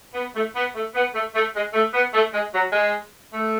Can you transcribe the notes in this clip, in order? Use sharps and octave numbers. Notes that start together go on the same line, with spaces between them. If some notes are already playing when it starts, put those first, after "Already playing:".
B3
A3
B3
A3
B3
A3
A3
G#3
A3
B3
A3
G#3
F#3
G#3
A3